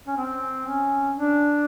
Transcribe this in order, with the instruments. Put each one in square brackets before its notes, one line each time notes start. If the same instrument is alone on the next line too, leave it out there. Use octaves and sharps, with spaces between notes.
[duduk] C#4
C4
C#4
D4